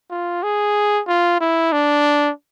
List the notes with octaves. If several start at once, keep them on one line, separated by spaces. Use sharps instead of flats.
F4
G#4
F4
E4
D4